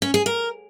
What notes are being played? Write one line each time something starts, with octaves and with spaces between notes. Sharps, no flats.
C#4
G#4
A#4